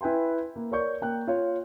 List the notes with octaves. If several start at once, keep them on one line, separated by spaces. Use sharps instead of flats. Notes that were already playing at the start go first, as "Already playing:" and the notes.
E4 B4 G5 G#5 C6
A#3
A#4 C#5 D5 C#6 G6
A#3 G5 F#6
F4 C#5